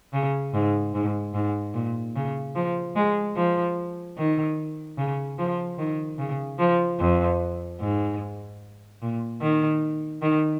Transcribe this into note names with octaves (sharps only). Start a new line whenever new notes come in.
C#3
G#2
G#2
G#2
A#2
C#3
F3
G#3
F3
D#3
C#3
F3
D#3
C#3
F3
F2
G#2
A#2
D#3
D#3